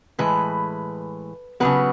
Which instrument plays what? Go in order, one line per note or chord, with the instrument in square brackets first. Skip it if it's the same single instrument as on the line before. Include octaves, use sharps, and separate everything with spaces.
[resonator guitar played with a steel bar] A2 E3 G#3 B4
C#3 F#3 B3 B4